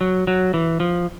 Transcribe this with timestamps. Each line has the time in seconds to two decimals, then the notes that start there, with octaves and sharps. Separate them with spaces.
0.01 F#3
0.27 F#3
0.54 E3
0.80 F3